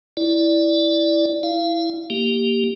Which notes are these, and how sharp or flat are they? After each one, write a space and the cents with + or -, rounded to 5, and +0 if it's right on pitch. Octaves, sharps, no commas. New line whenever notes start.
E4 +0 D5 +0
E4 +0 F5 -25
A#3 +0 G4 +0